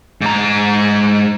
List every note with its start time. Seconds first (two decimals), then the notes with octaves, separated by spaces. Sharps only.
0.21 G#2 A#5